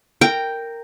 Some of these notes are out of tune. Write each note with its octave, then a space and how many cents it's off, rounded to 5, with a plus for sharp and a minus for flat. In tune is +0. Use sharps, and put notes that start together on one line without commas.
A#4 -10 G5 +0